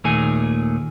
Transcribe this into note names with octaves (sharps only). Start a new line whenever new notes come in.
D#2 A#2 D#3 A3 G#4 G#5